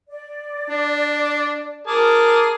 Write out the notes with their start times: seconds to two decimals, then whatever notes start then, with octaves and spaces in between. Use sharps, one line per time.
0.09 D5
0.69 D4
1.87 G#4 A#4 A5 D6